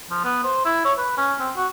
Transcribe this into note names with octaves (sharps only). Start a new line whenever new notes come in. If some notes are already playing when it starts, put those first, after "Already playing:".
F3
B3
C5
E4
C#5
B4
C#4
C4
F#4